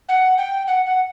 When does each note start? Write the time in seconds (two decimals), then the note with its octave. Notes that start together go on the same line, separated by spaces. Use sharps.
0.09 F#5
0.38 G5
0.67 F#5
0.86 F#5